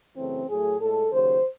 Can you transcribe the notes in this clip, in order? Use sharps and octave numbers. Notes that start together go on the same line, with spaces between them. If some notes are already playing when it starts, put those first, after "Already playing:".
F#2 C#3 E3 A3 C4
A2 F#3 A3 G#4
A2 G#3 A4
D#2 C#3 F#3 C5